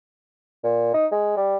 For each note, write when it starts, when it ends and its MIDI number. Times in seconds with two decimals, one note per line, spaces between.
0.64 0.89 46
0.94 1.06 63
1.12 1.36 56
1.37 1.57 55